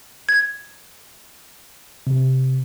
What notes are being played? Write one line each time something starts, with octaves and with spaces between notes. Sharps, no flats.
G#6
C3